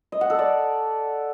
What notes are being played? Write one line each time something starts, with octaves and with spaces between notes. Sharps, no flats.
D#5
F#5
A4
D5